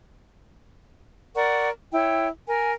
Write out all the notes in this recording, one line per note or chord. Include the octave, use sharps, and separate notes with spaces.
A#4 D5 F#5 C#6
E4 C#5 G5
A#4 G#5